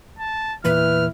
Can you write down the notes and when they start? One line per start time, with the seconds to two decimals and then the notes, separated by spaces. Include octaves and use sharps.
0.19 A5
0.65 E2 A#2 E3 E4 B4 F6